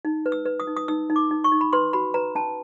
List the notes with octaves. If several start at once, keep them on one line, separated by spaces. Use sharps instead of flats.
D#4
B4
E6
B4
D#6
D#4
D#6
D#4 E6
D#4
D6
D#4
C#6
D#4
B5
B4 C6
F#4 B5
B4 A#5
C#4 A5